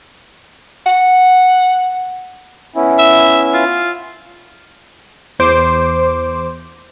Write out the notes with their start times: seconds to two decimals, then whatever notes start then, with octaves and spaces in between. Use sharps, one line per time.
0.86 F#5
2.76 B3 C#4 E4
2.98 E5
3.54 F4
5.39 E2 C5 D6